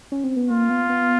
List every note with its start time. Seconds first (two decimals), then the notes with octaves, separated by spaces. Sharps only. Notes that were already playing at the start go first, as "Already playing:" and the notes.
0.12 C#4
0.24 C4
0.36 B3
0.49 A#3 F4
0.69 B3
0.89 B3